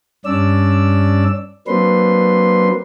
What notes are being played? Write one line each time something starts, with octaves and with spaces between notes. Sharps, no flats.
G2 C#4 D4 D5 E6
F#3 A#3 C4 D4 B4 C6